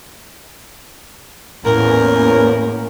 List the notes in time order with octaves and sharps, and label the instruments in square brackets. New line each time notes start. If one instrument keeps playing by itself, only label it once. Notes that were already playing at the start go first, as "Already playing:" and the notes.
[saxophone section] E2 A#4 [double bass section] A2 A#3 C#4